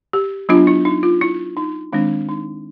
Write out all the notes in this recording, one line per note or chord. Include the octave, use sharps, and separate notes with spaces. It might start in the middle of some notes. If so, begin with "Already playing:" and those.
G4
F#3 B3 D4 F4
E4
D#4
F4
E4
D#4
D#3 G#3 C4 D4
D#4